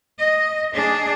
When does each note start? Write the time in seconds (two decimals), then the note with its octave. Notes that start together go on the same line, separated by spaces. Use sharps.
0.19 D#5
0.74 D4 G#4